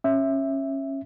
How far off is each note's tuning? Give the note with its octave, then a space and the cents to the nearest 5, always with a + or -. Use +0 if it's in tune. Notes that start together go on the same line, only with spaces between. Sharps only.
C#4 -20 E5 +0